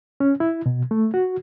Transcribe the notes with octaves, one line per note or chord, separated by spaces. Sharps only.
C#4
E4
B2
A3
F#4